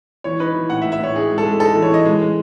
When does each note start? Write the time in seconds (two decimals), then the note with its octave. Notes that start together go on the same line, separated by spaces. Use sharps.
0.24 E3 C#5
0.40 D#4 B4
0.55 E3
0.70 A2 F#5
0.82 E5
0.86 A2
0.92 E5
1.00 A2 C#5
1.15 D#4 G#4
1.31 G#3
1.38 A4
1.45 G#3
1.60 D#4 A4
1.75 E3
1.82 C#5
1.90 E3 D#5
2.05 G#3
2.21 G#3